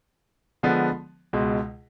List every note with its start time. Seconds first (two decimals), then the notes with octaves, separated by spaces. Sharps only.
0.63 D3 F3 G#3 B3
1.33 C#2 B2 G#3